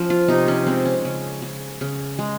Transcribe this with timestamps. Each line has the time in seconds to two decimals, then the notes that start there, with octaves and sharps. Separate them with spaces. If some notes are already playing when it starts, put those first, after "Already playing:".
Already playing: F3 C#4
0.10 F4
0.28 C3 D#4
0.48 C#4
0.67 G#3 C4
0.85 C#4
1.05 C#3
1.42 C#3
1.81 C#3
2.19 G#3